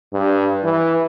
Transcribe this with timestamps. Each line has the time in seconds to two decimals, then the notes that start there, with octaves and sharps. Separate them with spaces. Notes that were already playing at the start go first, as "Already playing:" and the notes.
0.13 G2
0.64 E3